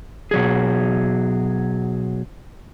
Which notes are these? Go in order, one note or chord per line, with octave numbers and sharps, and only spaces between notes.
B2 F#3 G#4